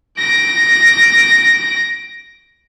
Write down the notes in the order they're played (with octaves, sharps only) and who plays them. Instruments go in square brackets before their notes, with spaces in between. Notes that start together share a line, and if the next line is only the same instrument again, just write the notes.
[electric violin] A#6 D7